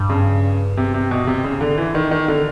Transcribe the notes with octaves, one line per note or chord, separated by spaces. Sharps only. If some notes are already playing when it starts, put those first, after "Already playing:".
Already playing: G2
C#3
C3
C3
B2
C3
G#2 C#3
D3
E3
D#3
G2 D#3
D3